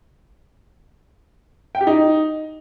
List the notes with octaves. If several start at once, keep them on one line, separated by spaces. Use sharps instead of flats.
G5
G4
D#4